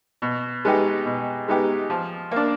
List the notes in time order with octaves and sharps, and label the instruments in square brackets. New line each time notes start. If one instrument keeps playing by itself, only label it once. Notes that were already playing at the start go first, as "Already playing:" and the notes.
[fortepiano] B2
G#3 B3 D#4 G4
B2
G#3 B3 D#4 G4
F3
A#3 D4